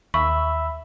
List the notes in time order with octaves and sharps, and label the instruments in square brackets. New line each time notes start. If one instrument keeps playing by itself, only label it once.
[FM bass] D#2 [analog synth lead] E5 [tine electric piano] B5 [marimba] C#6